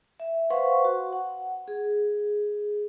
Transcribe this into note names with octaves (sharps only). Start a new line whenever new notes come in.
E5
B4 C5 F5 F#5 C6 C#6
F#4
F#5
G#4